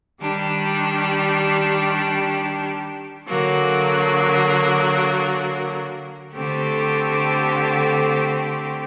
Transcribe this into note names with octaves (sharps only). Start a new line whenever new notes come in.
D#3 G3 D4 G4
D3 F#3 A#3
D3 A3 C4 G4